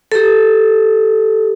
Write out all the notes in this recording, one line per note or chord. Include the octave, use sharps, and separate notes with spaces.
G4 A4